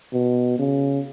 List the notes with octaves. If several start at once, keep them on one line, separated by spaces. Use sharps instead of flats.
B2
C#3